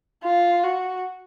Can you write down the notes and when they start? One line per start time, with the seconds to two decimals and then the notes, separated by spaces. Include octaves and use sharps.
0.23 F4
0.63 F#4